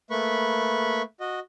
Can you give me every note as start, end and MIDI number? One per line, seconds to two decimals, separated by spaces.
0.11 1.02 57
0.11 1.02 58
0.11 1.02 71
0.11 1.02 83
0.11 1.02 85
1.20 1.39 66
1.20 1.39 75